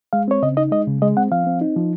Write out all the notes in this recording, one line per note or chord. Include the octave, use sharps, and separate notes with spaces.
G#3 F5
C4 C#5
C#3 D#5
D#4 D#5
G#3 D#5
C#3
G#3 D#5
C4 F#5
F3 F5
C4
D#4
F3